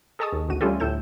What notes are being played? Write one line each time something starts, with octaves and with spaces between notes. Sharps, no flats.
G#4 A4 D#5 A5 C#6 D#6
D#2
A1 D2 F#4 D#7
G3 A3 C#4 F4 G4 A4
D2 A2 A4 G6 E7